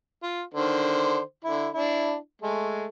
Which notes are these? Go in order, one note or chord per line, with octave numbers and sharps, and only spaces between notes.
F4
D3 D#3 C5
D3 E4
D4 E4
G#3 A3